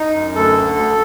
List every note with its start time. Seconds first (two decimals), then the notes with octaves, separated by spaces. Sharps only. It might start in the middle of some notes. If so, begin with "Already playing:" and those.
Already playing: D#4
0.14 F#2
0.36 D2 A4
0.56 D3
0.77 D2